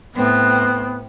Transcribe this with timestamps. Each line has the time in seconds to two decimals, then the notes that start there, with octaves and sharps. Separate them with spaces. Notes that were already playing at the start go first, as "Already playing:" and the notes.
0.15 A2 B3 C4